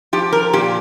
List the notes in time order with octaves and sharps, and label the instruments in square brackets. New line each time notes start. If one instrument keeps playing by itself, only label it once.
[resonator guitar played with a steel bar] F3 G4
A#4
A#2 G4